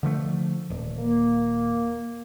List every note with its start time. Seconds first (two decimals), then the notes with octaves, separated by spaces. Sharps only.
0.03 D3 F3 A3
0.70 D#1
0.98 A#3